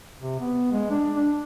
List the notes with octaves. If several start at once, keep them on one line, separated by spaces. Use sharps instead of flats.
C3
B3
G#3
D4
D4